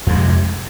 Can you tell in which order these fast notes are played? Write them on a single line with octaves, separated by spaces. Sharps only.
F2 G#3 C3